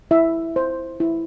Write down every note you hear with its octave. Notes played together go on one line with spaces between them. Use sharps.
E4 E5
C5
E4